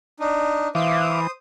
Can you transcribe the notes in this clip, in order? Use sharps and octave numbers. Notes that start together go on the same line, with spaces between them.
D4 D#4
E3 C5 E5 F5 D6 D#6